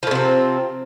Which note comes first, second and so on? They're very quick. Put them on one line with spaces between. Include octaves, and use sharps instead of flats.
F3 A2 C3 C4